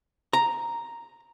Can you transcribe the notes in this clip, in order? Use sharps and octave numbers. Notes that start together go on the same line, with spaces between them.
A#5